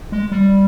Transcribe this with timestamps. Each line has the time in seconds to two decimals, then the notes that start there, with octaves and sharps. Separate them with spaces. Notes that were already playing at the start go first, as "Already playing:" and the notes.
0.12 G#3
0.31 G3